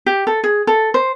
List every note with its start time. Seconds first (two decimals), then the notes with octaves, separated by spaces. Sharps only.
0.06 G4
0.27 A4
0.44 G#4
0.67 A4
0.94 C5